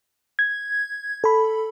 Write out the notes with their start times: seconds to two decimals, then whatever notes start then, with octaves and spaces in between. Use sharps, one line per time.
0.39 G#6
1.24 A4 B5